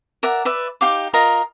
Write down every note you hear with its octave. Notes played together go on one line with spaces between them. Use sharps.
A#4 D5 E5 F#5
B4 D5 E5
D#4 G4 F5 D6
F4 A#4 D#5 A#5